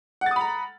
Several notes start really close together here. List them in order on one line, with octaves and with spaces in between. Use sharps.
F#5 A6 D#6 B5 A#5